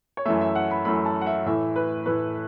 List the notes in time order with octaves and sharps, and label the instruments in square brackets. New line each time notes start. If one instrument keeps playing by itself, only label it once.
[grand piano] C#5
F#2 E3 A3 E5
E5
F#5
B5
F#2 E3 A3 B5
A5
F#5
E5
A2 E3 A3 E5
B4
A2 E3 A3 B4